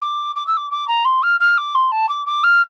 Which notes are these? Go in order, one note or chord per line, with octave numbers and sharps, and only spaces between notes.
D6
D6
E6
D6
D6
A#5
C6
F6
F6
D6
C6
A5
D6
D6
F6